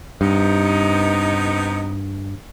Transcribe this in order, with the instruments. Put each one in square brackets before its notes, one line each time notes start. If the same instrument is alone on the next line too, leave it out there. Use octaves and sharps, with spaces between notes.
[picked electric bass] G2 [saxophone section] C3 B3 D#4